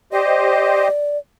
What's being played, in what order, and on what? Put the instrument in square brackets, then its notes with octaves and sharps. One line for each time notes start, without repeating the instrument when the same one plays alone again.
[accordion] G4 C5 D#5 [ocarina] D5